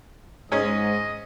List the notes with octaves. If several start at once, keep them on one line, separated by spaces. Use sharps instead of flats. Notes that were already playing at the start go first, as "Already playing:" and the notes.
G#2 G#3 C#4 C#5 D#5